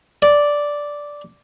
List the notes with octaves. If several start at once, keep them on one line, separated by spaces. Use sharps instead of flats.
D5